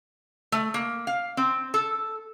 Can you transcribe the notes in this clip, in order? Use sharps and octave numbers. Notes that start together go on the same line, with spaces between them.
A3
A#3
F5
C4
A4